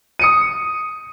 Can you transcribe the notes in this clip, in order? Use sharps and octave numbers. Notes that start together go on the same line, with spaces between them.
D#6 C#7 D#7